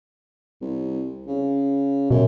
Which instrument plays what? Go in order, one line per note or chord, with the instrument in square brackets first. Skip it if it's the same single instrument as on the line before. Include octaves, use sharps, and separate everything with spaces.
[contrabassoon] C2
C#3
[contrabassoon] F#2 [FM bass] B2